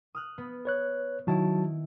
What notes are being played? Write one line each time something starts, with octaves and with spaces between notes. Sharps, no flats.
D#6 F6 F#6
B3
B4 C#5 F#6
D#3 F#3 E4 F#4 A5 D7